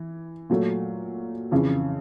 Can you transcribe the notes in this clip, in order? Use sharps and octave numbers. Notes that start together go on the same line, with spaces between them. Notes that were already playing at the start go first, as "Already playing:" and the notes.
Already playing: E3
A#2 F#3 A3
F2 C#3 E3